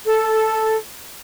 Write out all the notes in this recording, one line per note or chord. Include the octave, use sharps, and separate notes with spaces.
A4